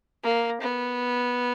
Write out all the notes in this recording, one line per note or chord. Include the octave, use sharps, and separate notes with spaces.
A#3
B3